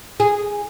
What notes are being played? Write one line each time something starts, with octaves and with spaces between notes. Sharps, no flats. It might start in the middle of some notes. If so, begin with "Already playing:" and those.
G#4